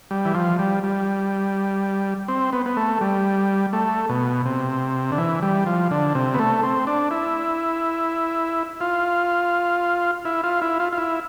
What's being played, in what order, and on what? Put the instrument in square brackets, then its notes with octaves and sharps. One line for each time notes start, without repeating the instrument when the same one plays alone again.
[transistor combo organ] G3
E3
F3
G3
G3
C4
B3
B3
A3
G3
A3
B2
C3
D3
E3
G3
F3
D3
C3
B3
A3
C4
D4
E4
F4
E4
F4
E4
F4
F4
E4